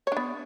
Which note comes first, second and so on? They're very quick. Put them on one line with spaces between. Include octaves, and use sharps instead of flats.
C#5 D4 B3